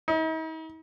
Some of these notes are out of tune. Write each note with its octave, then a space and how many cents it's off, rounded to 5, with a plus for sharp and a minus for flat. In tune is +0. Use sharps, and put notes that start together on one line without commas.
D#4 +45